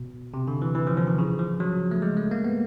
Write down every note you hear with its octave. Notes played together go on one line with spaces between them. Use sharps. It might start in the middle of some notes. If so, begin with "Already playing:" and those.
Already playing: B2
C3
D3
E3
E3
F3
F3
D#3
C#3
F3
F#3
A3
G#3
A3
A#3
B3